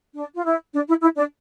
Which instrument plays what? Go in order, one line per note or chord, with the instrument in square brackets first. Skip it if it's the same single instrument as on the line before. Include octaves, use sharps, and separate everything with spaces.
[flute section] D4
F4
E4
D4
E4
E4
D4